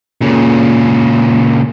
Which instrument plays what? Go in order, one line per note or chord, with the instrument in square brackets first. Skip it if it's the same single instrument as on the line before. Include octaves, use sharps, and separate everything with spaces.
[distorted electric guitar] A#2 C#3